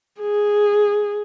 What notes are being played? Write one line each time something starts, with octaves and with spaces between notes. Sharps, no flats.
G#4